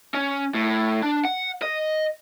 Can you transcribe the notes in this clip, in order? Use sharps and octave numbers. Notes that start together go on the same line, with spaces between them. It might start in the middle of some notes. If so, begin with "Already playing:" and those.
C#4
A2
D4
F#5
D#5